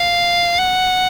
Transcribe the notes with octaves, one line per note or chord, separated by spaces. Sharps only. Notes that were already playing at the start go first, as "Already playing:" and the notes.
Already playing: F5
F#5